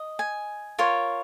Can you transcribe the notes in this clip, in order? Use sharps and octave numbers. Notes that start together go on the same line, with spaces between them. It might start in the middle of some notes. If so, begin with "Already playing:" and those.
Already playing: D#5
G#5
F4 A#4 C#5